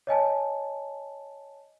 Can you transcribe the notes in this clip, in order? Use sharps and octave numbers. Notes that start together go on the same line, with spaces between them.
C#5 D#5 G#5 A5